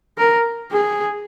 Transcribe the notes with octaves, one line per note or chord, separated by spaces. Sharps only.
A#4
G#4